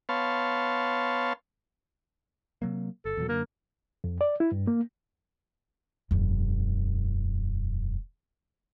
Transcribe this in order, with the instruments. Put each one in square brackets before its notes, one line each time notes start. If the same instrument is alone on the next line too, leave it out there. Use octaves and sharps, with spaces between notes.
[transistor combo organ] B3 C#5 F5 A5 C6
[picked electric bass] C3 F#3 A#3
[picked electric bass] G1 [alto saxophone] A4
[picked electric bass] E2 B2 F#3
[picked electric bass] F#2 D3 [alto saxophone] A#3
[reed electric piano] F2
D5
E4
G2
A#3
[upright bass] E1 F#2